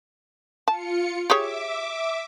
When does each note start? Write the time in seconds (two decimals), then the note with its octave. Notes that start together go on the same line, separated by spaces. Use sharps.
0.68 F4 A5 C#7
1.30 G4 G#4 C#5 E5 D6